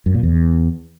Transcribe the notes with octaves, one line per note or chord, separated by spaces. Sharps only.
F#2
A#2
E2